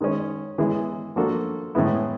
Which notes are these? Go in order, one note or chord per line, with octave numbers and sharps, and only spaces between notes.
D#3 G#3 C#4
E3 G#3 B3 E4 G#4
F3 A#3 D4 F#4 A4
A2 E3 G#3 B3 E4